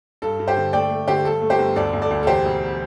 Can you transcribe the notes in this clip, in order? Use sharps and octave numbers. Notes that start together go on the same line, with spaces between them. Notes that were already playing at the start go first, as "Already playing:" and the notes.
G2 A4
G2
G4 C5
D3
A3 D5 G5
A3
D3 G4 C5
G2 A4
A3
G4 C5
G1
D2 A4 D5
D2
A4 D5
D2
A4
E2 G4 C5
E1